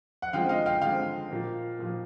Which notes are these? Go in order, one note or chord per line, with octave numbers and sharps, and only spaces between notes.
F#5
D3 F3 G#3 C4 F5 G5
D#5 F5
F5 G5
D3 F3 G#3 C4 F5 G5
A#2 F3 A#3
A#2 F3 A#3